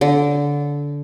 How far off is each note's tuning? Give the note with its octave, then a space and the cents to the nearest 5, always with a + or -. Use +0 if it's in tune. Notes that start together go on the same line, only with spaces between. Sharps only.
D3 -20